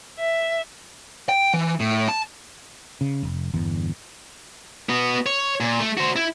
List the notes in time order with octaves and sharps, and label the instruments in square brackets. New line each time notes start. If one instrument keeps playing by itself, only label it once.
[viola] E5
[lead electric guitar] G5
E3
A2
A5
[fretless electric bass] C#3
F1
G1 E2
[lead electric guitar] B3 F#4
C#5
A#2
A3
F#4 C5
E4